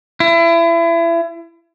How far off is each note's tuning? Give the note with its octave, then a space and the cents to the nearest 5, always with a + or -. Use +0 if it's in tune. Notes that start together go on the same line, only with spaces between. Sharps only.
E4 +30